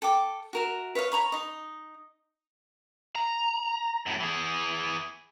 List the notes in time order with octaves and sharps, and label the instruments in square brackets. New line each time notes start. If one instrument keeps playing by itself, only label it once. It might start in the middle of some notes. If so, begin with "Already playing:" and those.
[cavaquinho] A4 G5 D6
F#4 A#4 E5
B4 C#5 D#5 F5
C#5 A#5 B5 C#6
D#4 D#5
[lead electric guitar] A#5
F#2 A2
E3 G#4